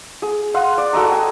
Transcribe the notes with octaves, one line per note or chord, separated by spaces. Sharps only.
G#4
F5 F#5 C6
D5
F#4 A4 D#5 A#5
G5 G#5